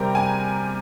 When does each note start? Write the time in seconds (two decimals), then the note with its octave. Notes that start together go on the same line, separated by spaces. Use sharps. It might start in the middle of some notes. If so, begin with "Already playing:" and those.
Already playing: C3 G3 C4 G4 A#4 A#5
0.15 G#5